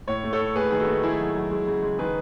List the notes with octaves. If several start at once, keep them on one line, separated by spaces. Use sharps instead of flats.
A2 C#5
A3
A4 C#5
A2
A3 G#4 B4
D#3 G#4
F#4 A4
A3
D#3 E4 G#4
F#3
F#3
G#3
C#3
G#3
D#3 G#4 B4